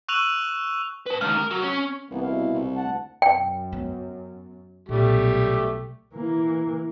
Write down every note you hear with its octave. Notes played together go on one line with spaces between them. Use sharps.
C#6 E6 F#6 D#7 F7 F#7
B4 A5
C#2 D#3 F6
A#4
F#3
C#4
C2 E3 A#3 B3
B2 E4 F5
C2
D2 F#5 A5
F#2 G5
B3
B1 A#2 G3 A3 G4
E3 A#3